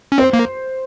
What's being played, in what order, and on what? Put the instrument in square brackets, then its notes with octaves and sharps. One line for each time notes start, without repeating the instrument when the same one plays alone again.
[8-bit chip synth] C#4
[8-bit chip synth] C4 [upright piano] C5
[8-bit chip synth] A#3